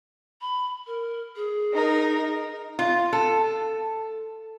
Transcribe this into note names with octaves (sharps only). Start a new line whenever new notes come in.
B5
A#4
G#4
D#4 A#4
F4
A4